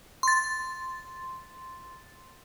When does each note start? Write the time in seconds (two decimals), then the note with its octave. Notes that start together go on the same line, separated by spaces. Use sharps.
0.23 C6 A6